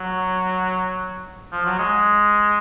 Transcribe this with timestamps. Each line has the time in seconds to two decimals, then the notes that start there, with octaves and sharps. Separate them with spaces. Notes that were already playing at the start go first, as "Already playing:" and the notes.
Already playing: F#3
1.52 F3
1.65 F#3
1.79 G#3